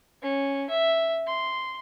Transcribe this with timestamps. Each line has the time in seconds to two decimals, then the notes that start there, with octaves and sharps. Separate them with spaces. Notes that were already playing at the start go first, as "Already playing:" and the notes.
0.22 C#4
0.69 E5
1.27 C6